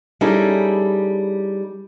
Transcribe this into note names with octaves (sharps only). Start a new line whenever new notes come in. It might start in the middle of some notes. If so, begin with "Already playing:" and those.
G3 C#4 D#4 E4 G#4 A4